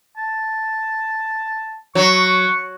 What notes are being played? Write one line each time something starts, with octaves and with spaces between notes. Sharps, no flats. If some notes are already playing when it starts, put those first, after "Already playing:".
A5
F#3 C#6